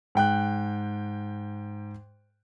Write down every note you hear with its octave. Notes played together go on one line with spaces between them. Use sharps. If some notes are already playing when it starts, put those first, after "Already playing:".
G#2 G5 F#6